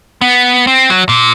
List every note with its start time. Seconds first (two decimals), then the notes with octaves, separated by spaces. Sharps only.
0.21 B3
0.67 C4
0.90 F#3
1.09 A#2